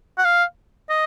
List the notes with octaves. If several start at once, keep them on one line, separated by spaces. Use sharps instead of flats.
F#5
F5
D#5